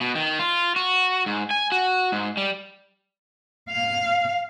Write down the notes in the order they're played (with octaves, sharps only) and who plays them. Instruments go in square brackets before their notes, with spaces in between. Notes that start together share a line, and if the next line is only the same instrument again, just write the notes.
[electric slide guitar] B2
D#3
F4
F#4
G#2
G#5
F#4
G#2
G3
[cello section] F5